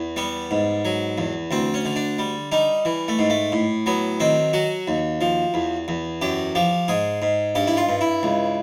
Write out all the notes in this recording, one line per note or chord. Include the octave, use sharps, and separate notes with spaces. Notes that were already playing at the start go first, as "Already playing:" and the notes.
Already playing: E2
G3 B3
G#2
F#3
E2
D2 C4
C#4
D3
D4
G3
G3 D#4
E3
A3
G#2
A3
A2
F#3 B3
D#3 C4
F#3 F#4
D#2
F3
E2
E2
F#2 G4
F3 G4
G#2 G#4
G#2
G2 G4
E4
F4
G2
E4
C#2